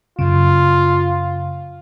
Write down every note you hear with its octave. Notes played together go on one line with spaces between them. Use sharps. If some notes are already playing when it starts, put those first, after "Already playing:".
F#2 C#3 F4